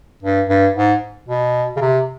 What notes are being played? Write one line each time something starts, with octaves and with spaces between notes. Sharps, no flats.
G2
G2
G#2
B2
C#3
C3